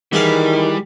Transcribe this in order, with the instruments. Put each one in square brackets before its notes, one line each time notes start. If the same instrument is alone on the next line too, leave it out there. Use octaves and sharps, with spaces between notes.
[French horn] D#3 [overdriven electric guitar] E3 [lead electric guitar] G3 [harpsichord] F#4 G#4 F5